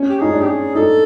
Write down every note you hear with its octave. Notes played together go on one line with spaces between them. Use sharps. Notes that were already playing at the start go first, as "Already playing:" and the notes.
Already playing: C#4
G4
D#4 G#4
D4
G4
G#4
D#4 A4